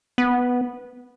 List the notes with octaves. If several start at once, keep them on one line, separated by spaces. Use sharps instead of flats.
B3